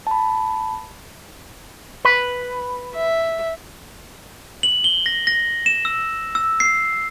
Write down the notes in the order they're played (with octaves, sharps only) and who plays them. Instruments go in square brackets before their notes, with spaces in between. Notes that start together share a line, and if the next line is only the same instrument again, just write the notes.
[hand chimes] A5 B5
[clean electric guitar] B4
[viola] E5
[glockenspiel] F#7
G7
A#6
A#6
E7
E6
E6
C7